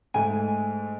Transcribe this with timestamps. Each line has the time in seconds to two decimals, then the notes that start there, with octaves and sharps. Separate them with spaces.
0.14 G#2 A3 G#5